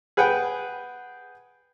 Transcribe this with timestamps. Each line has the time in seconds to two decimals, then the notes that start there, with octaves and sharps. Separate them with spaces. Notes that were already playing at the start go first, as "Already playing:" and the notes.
0.17 G#4 B4 F#5 G5